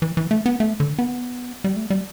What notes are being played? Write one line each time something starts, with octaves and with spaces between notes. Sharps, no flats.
E3
E3
A3
B3
A3
D3
B3
G3
A3
G3